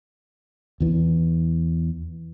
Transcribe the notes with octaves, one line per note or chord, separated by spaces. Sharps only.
E2 E3